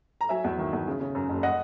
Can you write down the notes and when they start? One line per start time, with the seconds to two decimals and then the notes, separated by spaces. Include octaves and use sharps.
0.21 A#5
0.29 F#3 E5 G#5
0.44 E2
0.59 D#3
0.73 E2
0.87 C#3
1.00 C#3
1.15 F#2
1.29 F#1
1.43 D#5 F#5